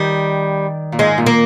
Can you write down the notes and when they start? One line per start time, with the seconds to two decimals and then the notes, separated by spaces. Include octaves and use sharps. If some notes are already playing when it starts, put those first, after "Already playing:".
Already playing: D#3 G3
0.92 A#2
0.99 G#2 G#3
1.18 A#2
1.26 A#3